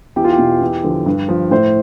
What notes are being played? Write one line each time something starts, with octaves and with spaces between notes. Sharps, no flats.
E2 G4
F4
G4
B2
E2
D3 F3
G2
F3
A2 C5